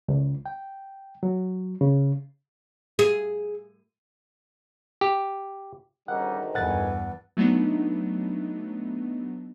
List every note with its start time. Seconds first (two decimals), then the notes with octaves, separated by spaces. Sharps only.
0.08 C#2
0.46 G5
1.23 F#3
1.81 C#3
2.99 G#4
5.01 G4
6.08 G#1 D2 D#3 G3 C#4 D#4 F#5
6.54 E2 G2 B4 F#5 G#5 A6
7.37 F#3 A3 B3 D4 D#4